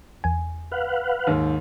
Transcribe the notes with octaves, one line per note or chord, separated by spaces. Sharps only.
E2 G#5
B4 F5 F#5
D#2 G#2